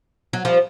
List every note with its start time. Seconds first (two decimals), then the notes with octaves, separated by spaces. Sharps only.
0.33 F#3
0.45 F3 G3